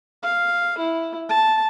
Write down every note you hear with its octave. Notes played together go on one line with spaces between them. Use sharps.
F5
E4
A5